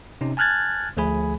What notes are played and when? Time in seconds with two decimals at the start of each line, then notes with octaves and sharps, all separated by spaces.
0.21 C3 C#4 D#4
0.37 G#5 A5 F6 F#6 G#6 A6
0.97 D2 F3 A3 G#4 G#5 B5